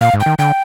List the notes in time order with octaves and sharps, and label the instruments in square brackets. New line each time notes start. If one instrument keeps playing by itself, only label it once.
[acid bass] A#2 [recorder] F5
[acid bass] G#2
[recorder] G5
[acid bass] D#3
[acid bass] D3 [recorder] G5